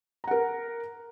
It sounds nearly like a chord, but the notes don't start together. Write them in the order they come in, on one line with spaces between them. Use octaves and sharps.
A#5 F#5 A#4